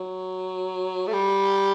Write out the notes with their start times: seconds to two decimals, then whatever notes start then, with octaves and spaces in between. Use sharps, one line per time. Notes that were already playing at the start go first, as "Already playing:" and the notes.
Already playing: F#3
1.07 A3
1.13 G3